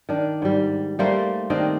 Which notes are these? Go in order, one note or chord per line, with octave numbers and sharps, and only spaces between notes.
D#3 D4
G#2 G3
G3 A3 A#3 C5
D#3 C4 D4 D#5